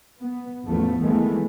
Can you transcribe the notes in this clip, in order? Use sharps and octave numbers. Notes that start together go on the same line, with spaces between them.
B3
A1 E2 F3 A3 B3
C2 D#3 E3 G#3 A3 B3